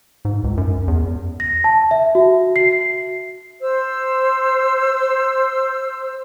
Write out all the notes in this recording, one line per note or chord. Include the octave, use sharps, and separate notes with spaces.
G#2
C#2
F#2
E2
A#6
A5
E5
F#4
C7
C5 E6